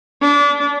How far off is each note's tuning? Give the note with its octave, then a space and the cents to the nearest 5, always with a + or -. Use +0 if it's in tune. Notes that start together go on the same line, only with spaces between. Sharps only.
D4 -30